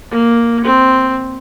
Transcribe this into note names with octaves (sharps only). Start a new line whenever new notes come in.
A#3
C4